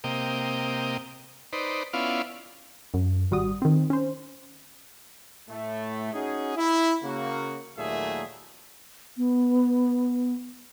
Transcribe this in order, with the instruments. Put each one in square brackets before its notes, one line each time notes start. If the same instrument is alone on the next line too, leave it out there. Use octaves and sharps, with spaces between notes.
[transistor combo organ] C3 A#3 D#5 G5
D#4 B4 C5 D5
B3 C#4 E4 F4 D5 F5
[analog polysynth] F#2
G#1 G3 F#4 D#6
D#3 C4
C#4 C5
[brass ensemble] A2 A3
C#4 D#4 F#4 G#4
E4
C#3 A#3 F#4
D#2 A#2 F#3 A3 G#4 E5
[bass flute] B3